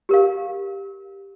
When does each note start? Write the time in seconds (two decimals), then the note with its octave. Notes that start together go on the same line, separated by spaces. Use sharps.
0.09 G4 A#4 F5